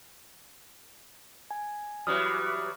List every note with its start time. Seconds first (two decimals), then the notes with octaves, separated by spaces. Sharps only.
1.51 G#5
2.07 E3 F#3 G3 D#6 F6